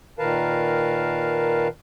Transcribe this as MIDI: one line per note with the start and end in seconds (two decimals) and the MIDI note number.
0.19 1.68 46
0.19 1.68 51
0.19 1.68 70
0.19 1.68 71
0.19 1.68 77
0.19 1.68 81